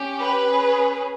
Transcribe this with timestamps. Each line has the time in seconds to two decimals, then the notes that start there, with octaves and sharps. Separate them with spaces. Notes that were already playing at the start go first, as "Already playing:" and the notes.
Already playing: C#4 G4
0.19 B4
0.48 C#4 G#4